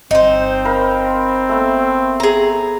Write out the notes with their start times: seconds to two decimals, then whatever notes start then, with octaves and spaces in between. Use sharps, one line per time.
0.11 G1 C4 D#4 C5
0.65 A#4 F5 B5
1.49 A3 B3
2.20 G#4 A#5